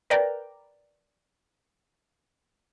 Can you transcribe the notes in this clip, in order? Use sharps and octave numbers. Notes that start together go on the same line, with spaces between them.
A#4 B4 D5 G5 A#5